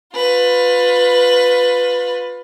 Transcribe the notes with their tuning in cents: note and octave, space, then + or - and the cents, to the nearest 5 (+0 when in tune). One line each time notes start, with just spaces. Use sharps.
F4 +25 B4 +10